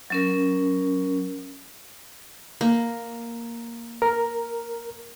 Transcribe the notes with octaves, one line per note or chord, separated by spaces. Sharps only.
F#3 C#4 A#4
A#3
A#4